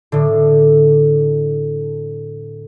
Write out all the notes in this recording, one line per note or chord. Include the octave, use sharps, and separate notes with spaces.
A2 D3